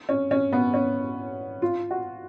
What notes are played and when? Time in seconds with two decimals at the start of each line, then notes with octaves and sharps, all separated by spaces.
0.09 C#4
0.31 C#4
0.52 B3
0.74 C#4
1.62 F4
1.91 F#4